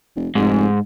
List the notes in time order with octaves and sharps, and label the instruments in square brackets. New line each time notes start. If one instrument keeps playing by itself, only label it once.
[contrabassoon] F1
[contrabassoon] F1 [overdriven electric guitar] G#2